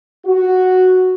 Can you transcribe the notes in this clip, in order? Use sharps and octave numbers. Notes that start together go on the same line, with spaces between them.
F#4